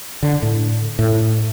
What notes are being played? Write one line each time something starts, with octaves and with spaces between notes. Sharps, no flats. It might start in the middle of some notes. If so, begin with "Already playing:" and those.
D3
A2
A2